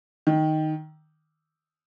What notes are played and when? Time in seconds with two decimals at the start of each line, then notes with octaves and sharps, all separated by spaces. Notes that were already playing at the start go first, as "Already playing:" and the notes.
0.27 D#3